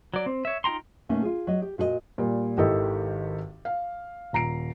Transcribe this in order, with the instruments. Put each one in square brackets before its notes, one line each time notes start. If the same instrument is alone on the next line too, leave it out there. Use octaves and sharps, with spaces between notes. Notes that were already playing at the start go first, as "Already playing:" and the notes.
[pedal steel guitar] F#3 D5
C4
C#5 E5
D#4 F4 G5 A#5 C6
[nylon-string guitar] B2 A3 A#3 C#4 D#4
F4 G#4
F#3 D#5
G4
A#2 F#4 G#4 D#5
[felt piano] A#2 G3
G#1 D#3 E4 G4 A4 D#5
F5
D#1 A#5 C7 D7